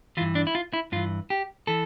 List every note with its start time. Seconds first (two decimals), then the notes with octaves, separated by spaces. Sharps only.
0.17 E3 F4
0.21 G2
0.35 D4
0.47 E4
0.55 F4
0.73 E4
0.92 G2 E3 F4
1.30 G4
1.67 E3 A4